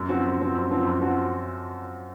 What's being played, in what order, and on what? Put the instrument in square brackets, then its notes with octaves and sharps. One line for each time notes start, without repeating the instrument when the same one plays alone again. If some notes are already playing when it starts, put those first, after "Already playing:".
Already playing: [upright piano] F#2
F3 C4 F#4
F#2
F3 C4 F#4
F#2
F3 C4 F#4
F#2
F3 C4 F#4